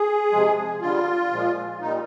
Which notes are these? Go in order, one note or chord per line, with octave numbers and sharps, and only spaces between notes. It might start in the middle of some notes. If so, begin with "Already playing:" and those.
Already playing: G#4
C3 F3 G#3
D3 G3 F4
A#2 F3 G#3
A#2 G3 D#4